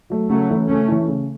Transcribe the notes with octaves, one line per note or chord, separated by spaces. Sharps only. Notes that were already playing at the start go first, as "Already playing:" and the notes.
F#3 A3
C#3 F#3 A3
E3 A3 C#4 E4
C#3 A3 C#4
E3 A3 C#4 E4
C#3